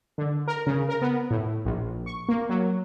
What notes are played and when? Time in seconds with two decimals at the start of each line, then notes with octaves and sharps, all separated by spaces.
0.18 D3
0.48 A#4
0.67 C#3
0.89 A#4
1.02 B3
1.31 A2
1.65 A#1
2.06 C#6
2.29 A#3
2.49 F#3